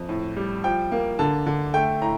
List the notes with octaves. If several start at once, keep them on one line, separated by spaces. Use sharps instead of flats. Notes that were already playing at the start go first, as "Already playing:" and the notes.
Already playing: F2
A2
G3
F3 G5
A#3
D3 A5
D3
A3 G5
A2 A#5